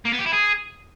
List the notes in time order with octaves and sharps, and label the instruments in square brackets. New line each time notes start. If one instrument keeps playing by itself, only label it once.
[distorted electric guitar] A#3
B3
G4
E4
G#4